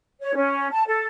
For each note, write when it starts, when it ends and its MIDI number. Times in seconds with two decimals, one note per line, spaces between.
0.21 0.34 73
0.34 0.69 61
0.71 0.82 81
0.87 1.07 69